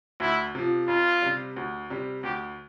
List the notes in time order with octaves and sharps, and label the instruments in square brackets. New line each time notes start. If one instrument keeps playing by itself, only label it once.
[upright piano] D2 [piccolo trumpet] E4
[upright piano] C3 F3
[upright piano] F2 [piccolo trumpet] F4
[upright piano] C3 G3
D2
C3 G3
[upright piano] D2 [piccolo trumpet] G4